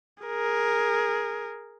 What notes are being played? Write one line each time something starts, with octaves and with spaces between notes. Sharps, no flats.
G#4 A#4